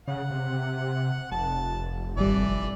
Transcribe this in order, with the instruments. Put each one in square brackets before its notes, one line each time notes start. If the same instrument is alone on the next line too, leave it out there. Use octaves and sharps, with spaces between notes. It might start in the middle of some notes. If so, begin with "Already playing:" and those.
[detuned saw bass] C#3 [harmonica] F#5
[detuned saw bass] C3
[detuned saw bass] F1 [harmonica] A5
[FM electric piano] G#1 G3 [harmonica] E3 D5